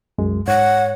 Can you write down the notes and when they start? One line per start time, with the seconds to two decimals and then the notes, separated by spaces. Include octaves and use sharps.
0.18 C2 F#2 G#3
0.48 G#2 C#5 F#5